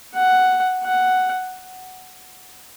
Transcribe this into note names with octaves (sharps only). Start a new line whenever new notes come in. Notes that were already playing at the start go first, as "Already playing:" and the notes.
F#5
F#5